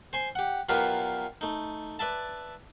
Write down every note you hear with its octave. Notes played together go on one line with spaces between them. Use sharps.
C5 G#5 C6
G4 F#5
B2 F#3 F4 G4 A#4 B4
A3 D#4
B4 D5 E5 A5